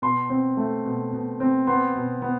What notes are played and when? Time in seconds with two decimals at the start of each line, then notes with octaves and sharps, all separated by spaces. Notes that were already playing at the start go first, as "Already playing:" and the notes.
0.02 B2 C6
0.30 C4
0.57 A3
0.86 B2
1.13 B2
1.40 C4
1.67 B3 C6
1.95 B2
2.22 B3